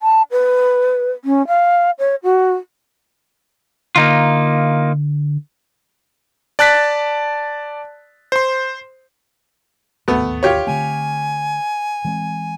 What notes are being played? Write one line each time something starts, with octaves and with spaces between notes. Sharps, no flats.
A5
B4
C#4
F5
C#5
F#4
D3 A#3 D#4 F4
D5 A5 F#6 A6 B6
C5 C6
D1 G#1 D#2 A3 B3
F4 G4 C#5
D3 A3 C4 G#5
E3 G#3 C4